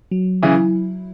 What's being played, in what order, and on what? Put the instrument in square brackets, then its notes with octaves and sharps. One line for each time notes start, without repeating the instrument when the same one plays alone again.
[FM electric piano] F#3
[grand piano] C#3 E3 [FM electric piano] E4